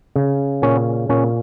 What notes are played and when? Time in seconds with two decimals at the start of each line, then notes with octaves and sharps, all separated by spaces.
0.16 C#3
0.62 A#2 C#4
1.09 A#2 C#4